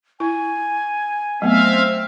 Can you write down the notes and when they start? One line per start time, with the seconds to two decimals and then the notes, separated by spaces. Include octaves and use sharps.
0.20 E4 G#5
1.42 F#3 A3 B3 C4 E5 F5